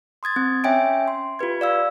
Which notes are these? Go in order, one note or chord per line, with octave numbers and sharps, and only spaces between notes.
C6 D#6 G#6 A6
C4
C#4 C#5 E5 G5 G#5 D7
C6
F4 G4 B4 G#6
D5 F5 E6